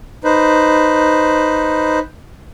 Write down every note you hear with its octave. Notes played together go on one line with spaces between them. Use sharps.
D#4 B4 C5